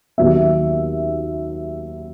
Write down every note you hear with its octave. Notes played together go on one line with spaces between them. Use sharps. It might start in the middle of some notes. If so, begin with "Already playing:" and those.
D#2 D#3 F#3 B3 E5